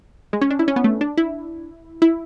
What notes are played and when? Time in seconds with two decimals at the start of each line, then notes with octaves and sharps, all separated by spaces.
0.33 G#3
0.41 C#4
0.50 D4
0.59 E4
0.68 C#4
0.76 B3
0.84 A3
1.01 D4
1.17 E4
2.02 E4